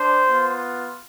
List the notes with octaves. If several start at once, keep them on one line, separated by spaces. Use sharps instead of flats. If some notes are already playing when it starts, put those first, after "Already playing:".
Already playing: D4 C5
B3 F4